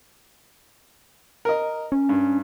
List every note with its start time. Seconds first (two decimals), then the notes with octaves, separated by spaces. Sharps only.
1.45 A#4 D#5
1.92 C#4
2.09 G2